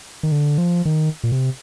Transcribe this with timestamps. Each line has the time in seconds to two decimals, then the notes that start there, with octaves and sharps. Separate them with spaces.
0.23 D#3
0.32 D3
0.58 F3
0.85 D#3
1.23 A#2
1.32 C3